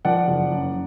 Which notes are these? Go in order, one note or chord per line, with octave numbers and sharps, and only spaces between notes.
F3 D5 F#5
F#1
F#2